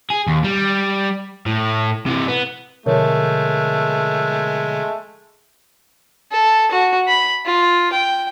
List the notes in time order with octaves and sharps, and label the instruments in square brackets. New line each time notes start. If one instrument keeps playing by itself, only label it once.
[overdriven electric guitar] G#4
D#2
G3
A2
C3 E3
B3
[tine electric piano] B2 D3 F3 [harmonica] G#3 A3 [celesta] A#4 C#5
[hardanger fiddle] A4
F#4
B5
F4
G5